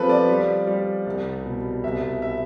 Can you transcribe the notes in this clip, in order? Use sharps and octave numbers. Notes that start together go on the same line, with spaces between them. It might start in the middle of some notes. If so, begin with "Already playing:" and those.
Already playing: F3 G3 B3 C4 A4 B4
D5
G3
G3
C2
B2
C2 E5
E5